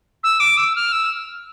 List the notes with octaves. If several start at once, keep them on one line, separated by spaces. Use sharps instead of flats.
E6
D6
E6
F6
E6